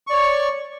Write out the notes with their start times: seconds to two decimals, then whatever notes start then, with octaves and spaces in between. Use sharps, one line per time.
0.07 C#6
0.10 D5
0.13 C#5